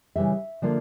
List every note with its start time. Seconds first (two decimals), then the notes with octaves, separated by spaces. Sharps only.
0.16 C#3 E3 G3 E5
0.62 D3 F3 A#3 D4 F4